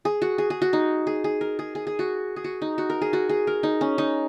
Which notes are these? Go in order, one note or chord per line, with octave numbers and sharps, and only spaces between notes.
G#4
F#4
G#4
G#4
F#4
D#4
G#4
G#4
A#4
G#4
G#4
G#4
F#4
G#4
F#4
D#4
F#4
A#4
G#4
F#4
G#4
A#4
D#4
C#4
D#4